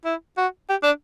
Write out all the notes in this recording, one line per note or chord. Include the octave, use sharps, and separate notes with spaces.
E4
F#4
G4
D4